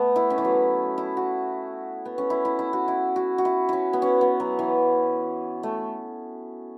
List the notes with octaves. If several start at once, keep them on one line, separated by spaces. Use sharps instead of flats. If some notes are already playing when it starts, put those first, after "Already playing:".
Already playing: A3 B3
E4
C#4
E3
F#3
E4
F#4
B3
C#4
E4
E4
E4
F#4
E4
F#4
F#4
E4
C#4 E4
B3
C#4
B3
F#3
E3
A3